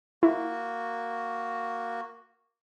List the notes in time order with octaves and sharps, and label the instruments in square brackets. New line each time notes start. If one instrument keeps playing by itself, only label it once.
[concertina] A#3 F#4 [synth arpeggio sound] E4